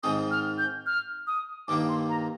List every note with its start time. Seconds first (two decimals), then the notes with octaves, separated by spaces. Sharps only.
0.03 G#2 D#3 G#3 C4 D#6
0.31 F6
0.58 G6
0.86 F6
1.27 D#6
1.68 G2 D#3 A#3 D6
1.89 C6
2.09 A#5